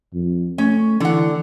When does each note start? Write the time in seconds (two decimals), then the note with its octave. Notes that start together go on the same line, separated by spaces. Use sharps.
0.14 F2
0.58 A3 C#4
1.00 D3 E3 F#5